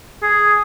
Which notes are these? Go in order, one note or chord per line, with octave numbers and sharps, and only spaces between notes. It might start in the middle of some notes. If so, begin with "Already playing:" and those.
G#4